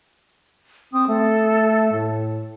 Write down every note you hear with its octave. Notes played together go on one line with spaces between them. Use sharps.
C4 D#6
A3 A4
A2